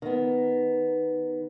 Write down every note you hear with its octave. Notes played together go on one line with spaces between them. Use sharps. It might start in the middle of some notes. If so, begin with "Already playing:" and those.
D#3 B3